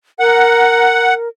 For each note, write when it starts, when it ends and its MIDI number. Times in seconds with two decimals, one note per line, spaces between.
0.20 1.28 70
0.20 1.14 78